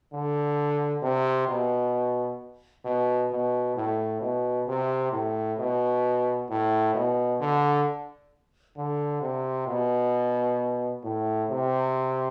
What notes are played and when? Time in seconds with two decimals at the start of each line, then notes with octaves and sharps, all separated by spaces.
0.13 D3
1.03 C3
1.48 B2
2.85 B2
3.31 B2
3.76 A2
4.21 B2
4.67 C3
5.12 A2
5.58 B2
6.49 A2
6.95 B2
7.40 D3
8.77 D3
9.21 C3
9.67 B2
11.03 A2
11.49 C3